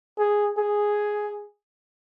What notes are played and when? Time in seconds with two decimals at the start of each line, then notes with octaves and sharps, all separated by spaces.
0.19 G#4
0.57 G#4